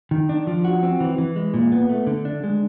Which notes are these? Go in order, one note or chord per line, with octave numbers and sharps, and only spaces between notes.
D#3
D4
F3
F#4
C4
E3
E3
G#3
A#2
B3
A3
D3
D4
G#3